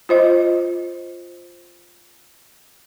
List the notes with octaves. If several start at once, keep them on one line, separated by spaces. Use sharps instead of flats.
F4 C5 D#5